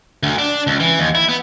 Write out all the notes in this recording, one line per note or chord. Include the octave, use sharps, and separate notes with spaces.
D2
D4
C#2
E3
D#2
E4
B3